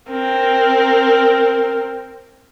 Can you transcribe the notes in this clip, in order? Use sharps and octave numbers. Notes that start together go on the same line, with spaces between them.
C4 A#4